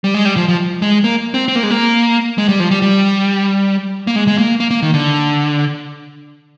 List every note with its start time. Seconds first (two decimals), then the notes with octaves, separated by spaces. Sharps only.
0.04 G3
0.14 G#3
0.25 G3
0.37 F3
0.48 F3
0.82 G#3
1.04 A#3
1.34 C4
1.48 C4
1.56 A#3
1.63 G#3
1.71 A#3
2.38 G#3
2.49 G3
2.60 F3
2.71 G3
2.82 G3
4.07 A#3
4.16 G#3
4.28 G#3
4.38 A#3
4.60 A#3
4.71 A#3
4.82 D#3
4.94 D3